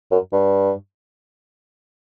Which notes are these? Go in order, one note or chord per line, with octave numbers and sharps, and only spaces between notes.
F#2
G2